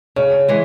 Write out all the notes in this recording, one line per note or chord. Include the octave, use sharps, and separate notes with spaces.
C#3 C#5
E3 G#3